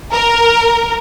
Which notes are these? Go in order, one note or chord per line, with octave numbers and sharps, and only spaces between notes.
A#4